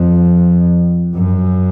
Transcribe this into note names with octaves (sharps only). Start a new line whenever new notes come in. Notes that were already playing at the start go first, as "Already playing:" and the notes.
Already playing: F2
F#2